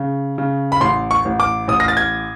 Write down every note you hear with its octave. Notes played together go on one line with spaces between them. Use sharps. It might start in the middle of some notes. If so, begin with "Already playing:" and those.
Already playing: C#3
C#3
B5
A1 C6
C#6
A1
D6
A1 D#6
A#6
A6
G#6